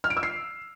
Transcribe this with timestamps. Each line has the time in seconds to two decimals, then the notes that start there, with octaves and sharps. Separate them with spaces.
0.04 F6
0.10 D7
0.17 E6
0.23 C7